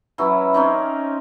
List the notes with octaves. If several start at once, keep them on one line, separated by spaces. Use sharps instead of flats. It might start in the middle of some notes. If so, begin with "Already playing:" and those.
E3 F#3 C#4 E4
C4 C#4 D#4 D5